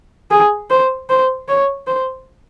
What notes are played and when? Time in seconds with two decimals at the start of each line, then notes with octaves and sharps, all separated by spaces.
0.31 G#4
0.70 C5
1.09 C5
1.48 C#5
1.87 C5